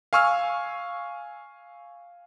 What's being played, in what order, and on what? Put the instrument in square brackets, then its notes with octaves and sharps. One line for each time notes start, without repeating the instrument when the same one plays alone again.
[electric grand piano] F5 G#5 C#6 E6 F6